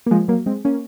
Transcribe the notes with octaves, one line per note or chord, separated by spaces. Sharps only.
A#3
F3 G#3
F#3 A#3
G#3 C4
A#3 C#4